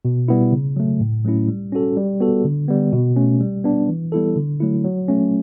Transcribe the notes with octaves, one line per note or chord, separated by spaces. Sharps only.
B2
G3 B3 E4
C#3
F#3 A3
A2
F#3 A3 C#4 E4
G3
C#4 F#4 A4
G3
B3 F#4 A4
D3
G3 B3
B2
A3 C#4
G3
B3 D4
E3
G3 B3 E4 A4
D3
F#3 A3 E4
F#3
A3 C#4